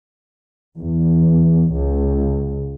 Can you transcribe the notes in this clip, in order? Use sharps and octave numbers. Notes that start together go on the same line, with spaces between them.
E2
C#2